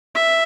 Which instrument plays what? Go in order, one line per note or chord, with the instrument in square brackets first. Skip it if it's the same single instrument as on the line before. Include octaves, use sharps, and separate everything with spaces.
[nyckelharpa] E5